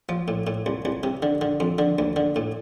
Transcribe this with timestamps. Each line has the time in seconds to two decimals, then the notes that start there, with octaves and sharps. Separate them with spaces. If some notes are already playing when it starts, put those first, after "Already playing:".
0.09 F3
0.28 A2
0.47 A2
0.66 C2
0.85 C2
1.03 C3
1.22 D3
1.41 D3
1.60 F2
1.78 D3
1.99 D2
2.16 D3
2.36 A2